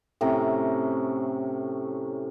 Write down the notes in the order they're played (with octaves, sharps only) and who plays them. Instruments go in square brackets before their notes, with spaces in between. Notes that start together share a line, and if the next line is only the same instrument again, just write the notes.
[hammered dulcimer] A2 C3 C#4 A#5